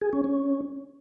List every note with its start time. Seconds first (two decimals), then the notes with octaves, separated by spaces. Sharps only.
0.01 G#4
0.13 C#4
0.24 C#4